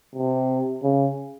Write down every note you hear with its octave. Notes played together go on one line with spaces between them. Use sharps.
C3
C#3